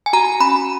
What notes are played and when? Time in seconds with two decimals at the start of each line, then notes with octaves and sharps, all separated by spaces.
0.06 G#5
0.13 F#4 A#5
0.40 C#4 B5